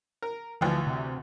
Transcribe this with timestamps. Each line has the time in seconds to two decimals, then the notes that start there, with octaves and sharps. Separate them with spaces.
0.22 A#4
0.61 D2 E3 F3
0.87 C3